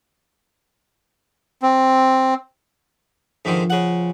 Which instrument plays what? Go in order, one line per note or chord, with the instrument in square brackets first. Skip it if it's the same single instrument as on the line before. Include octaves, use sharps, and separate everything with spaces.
[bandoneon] C4
[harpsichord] G#2 D3 D#3 [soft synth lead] F3
[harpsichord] C#3 F#5